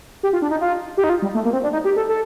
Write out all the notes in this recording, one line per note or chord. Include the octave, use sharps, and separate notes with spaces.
G4
F4
D4
D#4
F4
G4
D#4
F4
G3
A3
A#3
C4
D4
D#4
G4
A4
A4